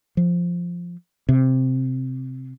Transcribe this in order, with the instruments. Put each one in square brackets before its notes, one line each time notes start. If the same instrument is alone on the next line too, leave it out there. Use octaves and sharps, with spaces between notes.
[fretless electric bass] F3
C3